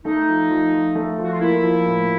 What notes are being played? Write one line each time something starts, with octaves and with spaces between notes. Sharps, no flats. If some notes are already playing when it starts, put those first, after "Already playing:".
A3 D#4
F3
F3
F3
A3
F3 F#4
F4
A#3 E4
F3
A2